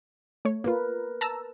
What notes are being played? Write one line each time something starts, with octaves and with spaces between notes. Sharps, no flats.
A3 C#5
A#3 F4 A#4 B4
A5 A#5 E6